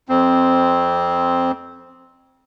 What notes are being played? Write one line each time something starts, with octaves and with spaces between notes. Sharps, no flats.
F2 C4